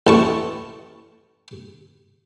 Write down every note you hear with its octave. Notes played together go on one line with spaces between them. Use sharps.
A1 A5 C#6